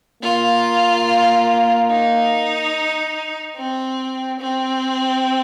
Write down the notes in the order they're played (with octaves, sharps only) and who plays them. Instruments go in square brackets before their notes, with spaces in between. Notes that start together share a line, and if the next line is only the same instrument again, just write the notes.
[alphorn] A#3 [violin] F4
[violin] D#4
C4
C4